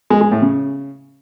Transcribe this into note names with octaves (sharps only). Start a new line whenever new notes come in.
G#3
G#3
A2
C#3